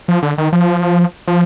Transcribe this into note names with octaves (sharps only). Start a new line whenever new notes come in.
F3
D3
D#3
F3
F3